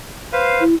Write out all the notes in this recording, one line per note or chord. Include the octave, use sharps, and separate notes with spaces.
B4 C5 F5
E4